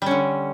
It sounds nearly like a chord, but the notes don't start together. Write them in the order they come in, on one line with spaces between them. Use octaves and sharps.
G3 C#4 D3